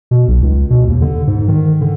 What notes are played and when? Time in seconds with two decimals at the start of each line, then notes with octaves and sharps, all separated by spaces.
0.11 B2
0.28 B1
0.42 C#2
0.70 B2
0.88 D#2
1.01 D3
1.27 G#2
1.48 D#3
1.81 D3